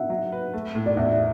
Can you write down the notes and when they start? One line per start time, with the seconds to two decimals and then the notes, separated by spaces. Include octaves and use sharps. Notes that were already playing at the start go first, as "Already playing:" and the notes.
Already playing: E5 F#5
0.10 F#3
0.32 B4
0.53 A3
0.75 A2
0.86 D5
0.97 E2 E5